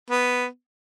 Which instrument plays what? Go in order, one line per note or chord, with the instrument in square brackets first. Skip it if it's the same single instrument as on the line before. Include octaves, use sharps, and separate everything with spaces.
[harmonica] B3